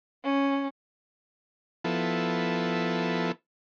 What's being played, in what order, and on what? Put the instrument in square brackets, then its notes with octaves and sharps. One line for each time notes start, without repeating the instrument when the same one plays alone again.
[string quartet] C#4
[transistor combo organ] F3 B3 E4 A4